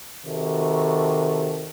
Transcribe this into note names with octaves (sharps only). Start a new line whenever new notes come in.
C3 D#3 F#4 A4